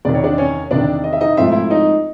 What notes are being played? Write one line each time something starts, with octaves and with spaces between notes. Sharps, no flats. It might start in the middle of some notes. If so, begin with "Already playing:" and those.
E2 C3 D#3 D5
C#5
D4 D5
C#4 C#5
E2 C3 D#3 D4 D5
D#5
E5
D#4 D#5
G#2 F3 A3 C4 E5
E4 E5
D#4 D#5